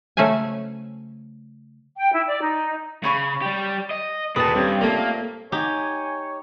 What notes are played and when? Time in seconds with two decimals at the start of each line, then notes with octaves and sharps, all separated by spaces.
0.17 C#3 F#3 A3 C#4 C5 G#5
1.97 G5
2.13 E4
2.27 D5
2.41 D#4
3.03 C#3 C#5 B5 C#6
3.42 G3 G4
3.91 D#5
4.36 D#1 A#2 B4 A5 D#6
4.54 G2 C4 C#4 G4
4.81 A#2 A3 A#3
5.52 D#4 G4 C#5 G#5